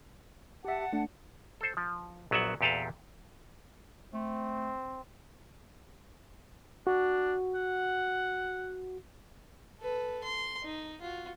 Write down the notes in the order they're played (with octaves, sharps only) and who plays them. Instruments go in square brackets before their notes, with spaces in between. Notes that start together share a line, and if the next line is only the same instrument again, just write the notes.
[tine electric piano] G4 E5 [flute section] F#5 A5
[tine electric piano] A3 D4
[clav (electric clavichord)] A4 C5
F3
A#1 F#3 B3 E5 F#5
E2 A#2 G4 A4 B4 F5
[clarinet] A3 [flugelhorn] C4
[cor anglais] D4 [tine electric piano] F#4
[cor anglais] F#5
[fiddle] A4 B4
C6
D#4
F4 F#4